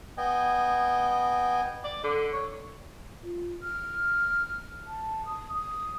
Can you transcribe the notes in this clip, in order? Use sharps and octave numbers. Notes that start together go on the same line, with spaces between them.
B3 D#5 G5 G#5
D5
D3
C#5
F4
F6
A5
D#6
D#6